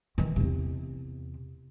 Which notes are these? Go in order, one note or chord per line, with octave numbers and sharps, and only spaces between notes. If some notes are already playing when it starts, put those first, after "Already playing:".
D#3 E3
E2 C3